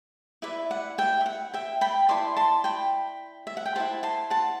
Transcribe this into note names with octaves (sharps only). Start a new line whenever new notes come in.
E4 B4 D5 E5
F#5
E5 G5
E5
F#5
E5 G5
G5 B5
E4 B4 D5 A5 C6
A5 C6
G5 B5
E5
F#5
G5
E4 A4 C5 F#5 A5
A5 C6
F#5 A5